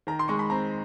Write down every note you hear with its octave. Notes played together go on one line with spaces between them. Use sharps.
D#3 A#5
C6
G#3 C#6
B5
C4 A#5